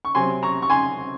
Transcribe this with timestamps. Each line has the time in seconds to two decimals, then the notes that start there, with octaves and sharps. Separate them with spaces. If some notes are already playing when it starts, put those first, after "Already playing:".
0.05 C#6
0.15 C3 F#3 C4 G#5 C6
0.43 A#5 C#6
0.62 C#6
0.70 G#5 C6